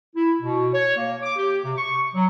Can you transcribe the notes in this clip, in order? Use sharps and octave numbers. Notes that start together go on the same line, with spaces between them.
E4
B2
C#5
A#3
D6
G4
C3
C#6
F#3